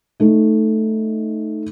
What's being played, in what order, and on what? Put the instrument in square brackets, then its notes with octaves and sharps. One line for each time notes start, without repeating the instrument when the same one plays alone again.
[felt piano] A3 D#4